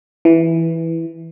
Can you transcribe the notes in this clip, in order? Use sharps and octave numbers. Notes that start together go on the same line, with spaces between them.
E3